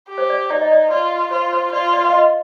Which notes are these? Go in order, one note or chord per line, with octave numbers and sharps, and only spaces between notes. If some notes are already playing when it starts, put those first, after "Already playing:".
G4
C5
D5
D#4 D5
D#5
D5
F4 D5
F4 C5
C5
F4 D5
D5
F5
D#5